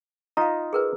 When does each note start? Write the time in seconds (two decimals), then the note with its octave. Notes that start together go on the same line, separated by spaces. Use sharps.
0.37 D#4 F4 D#5 F5 A#5
0.73 G#4 A#4 B4